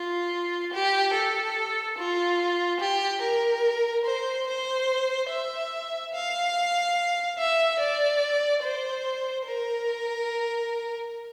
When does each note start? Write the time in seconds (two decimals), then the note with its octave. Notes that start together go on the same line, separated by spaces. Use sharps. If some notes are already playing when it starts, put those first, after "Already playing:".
Already playing: F4
0.73 G4
1.14 A4
1.98 F4
2.80 G4
3.22 A#4
4.05 C5
4.47 C5
5.30 E5
6.14 F5
7.38 E5
7.79 D5
8.62 C5
9.45 A#4